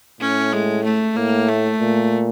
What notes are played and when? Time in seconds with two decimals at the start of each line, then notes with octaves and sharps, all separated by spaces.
0.21 A2 C#4
0.52 G#3
0.84 A3
1.16 A2 A#3
1.48 A3
1.80 A#2